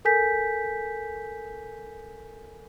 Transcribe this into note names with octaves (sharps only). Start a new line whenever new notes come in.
A4 A#4 G#5 G6 B6